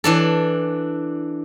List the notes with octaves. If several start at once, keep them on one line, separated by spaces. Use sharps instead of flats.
E3 D4 A4